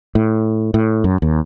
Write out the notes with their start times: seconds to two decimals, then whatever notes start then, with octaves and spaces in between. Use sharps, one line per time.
0.15 A2
0.74 A2
1.04 F#2
1.22 D#2